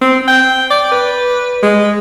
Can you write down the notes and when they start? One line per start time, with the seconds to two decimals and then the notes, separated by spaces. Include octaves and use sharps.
0.01 C4
0.28 G5
0.70 D5
0.92 B4
1.63 G#3